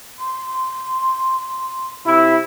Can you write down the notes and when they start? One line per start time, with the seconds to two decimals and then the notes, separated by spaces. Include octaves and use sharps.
0.19 C6
2.05 C3 E4